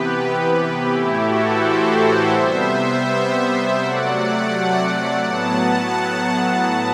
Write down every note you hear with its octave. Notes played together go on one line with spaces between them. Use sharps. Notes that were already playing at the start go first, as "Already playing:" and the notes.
Already playing: C3 E3 B3 G4 B4
A2 E3 A3 E4 G4
F#4 A4
A4 C5
C3 G3 B3 C5 E5
C3 F#3 A3 D5 F#5
A2 F#3 B3 F#5 A5